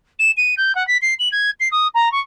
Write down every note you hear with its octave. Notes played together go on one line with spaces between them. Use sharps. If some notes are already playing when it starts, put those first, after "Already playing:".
E7
D#7
G6
F#5
B6
C7
F#7
G#6
C7
D#6
A#5
C#6